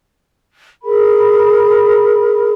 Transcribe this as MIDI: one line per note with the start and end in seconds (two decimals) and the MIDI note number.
0.82 2.51 68
0.82 2.51 70
0.82 2.51 83